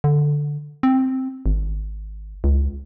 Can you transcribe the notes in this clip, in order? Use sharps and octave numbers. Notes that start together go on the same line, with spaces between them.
D3
C4
G#1
C#2